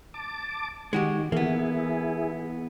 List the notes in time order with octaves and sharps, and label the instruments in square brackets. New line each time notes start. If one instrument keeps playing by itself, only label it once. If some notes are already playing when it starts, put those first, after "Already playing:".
[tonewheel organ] A5 D6
[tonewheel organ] D#3 [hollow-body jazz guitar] G#3 F#4 G4
[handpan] E3 [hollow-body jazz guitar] A#3 B3 [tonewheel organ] E4 G#4